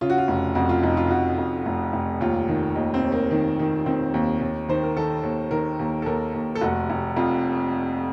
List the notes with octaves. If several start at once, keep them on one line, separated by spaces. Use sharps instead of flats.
C#3 F4
F#4
F4
F1
F2 F#4
F4
F1 D#4
F4
F1 F#4
F2
F1
F1
D#2 F4
D#3
D#2 D#4
C4
D#2
A#3
D#3
D#3
D#3 C4
D#2
D#2
D#3 C5
A#4
D#3 A4
D#2
D#3 A#4
D#2
A4
D#2 A#4
D#2
A4
F1 F#4
F1
F2 F4